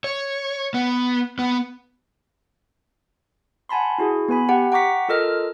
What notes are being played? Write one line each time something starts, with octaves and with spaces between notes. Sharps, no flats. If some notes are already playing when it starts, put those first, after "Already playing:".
C#5
B3
B3
F#5 G#5 A5 B5 C6
E4 F#4 G#4
B3 B4 G#5 B5
G4 F#5 G5
F#5 G5 A#5 C#6 D6 B6
F4 A4 A#4 D#5 F6